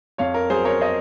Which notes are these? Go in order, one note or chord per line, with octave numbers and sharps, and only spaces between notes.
F2 C#5 F5
A#4
F#3 G#4 C5
A#4 C#5
C5 D#5